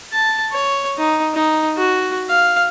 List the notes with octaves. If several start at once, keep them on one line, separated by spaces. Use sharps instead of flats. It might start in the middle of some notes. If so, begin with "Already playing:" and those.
A5
C#5
D#4
D#4
F#4
F5